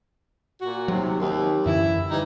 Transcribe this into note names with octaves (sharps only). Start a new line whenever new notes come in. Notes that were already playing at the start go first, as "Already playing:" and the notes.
A#2 F#4
D#2 C3 F#3
D#2
F#2 D3 E3 E4
E3 G3 D#4